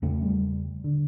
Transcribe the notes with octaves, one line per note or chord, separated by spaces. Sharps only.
E2 C#3 A3
G3
D3